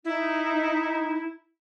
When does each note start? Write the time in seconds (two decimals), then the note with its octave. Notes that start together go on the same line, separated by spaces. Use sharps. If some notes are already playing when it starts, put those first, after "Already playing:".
0.05 D#4 E4